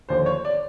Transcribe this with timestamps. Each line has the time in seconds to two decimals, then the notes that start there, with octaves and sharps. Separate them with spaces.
0.09 D#2 D3 F3 C5
0.26 C#5
0.45 D5